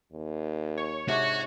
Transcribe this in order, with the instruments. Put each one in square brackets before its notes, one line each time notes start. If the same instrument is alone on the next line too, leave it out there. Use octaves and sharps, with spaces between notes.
[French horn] D#2
[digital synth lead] C#5
[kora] G#2 C3 D4 [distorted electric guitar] F#4